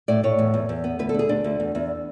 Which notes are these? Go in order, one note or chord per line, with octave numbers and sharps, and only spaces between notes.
A2 D5
A2 C#5
E2
E2
E2
B3
D2 B4
A4
D4 G#4
D2 D4
D2
E2
E2